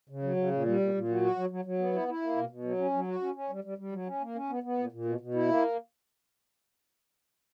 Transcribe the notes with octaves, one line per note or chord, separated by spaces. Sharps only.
C#3
F#3
C#3
A#2
G3
A#2
A#2
F#3
F#4
F#3
F#3
F#3
B3
E4
E4
A#3
B2
B2
F#3
C#4
F#3
F#4
C#4
C#4
G3
G3
G3
F#3
C#4
A#3
C#4
B3
B3
A#2
A#2
B2
B2
E4
A#3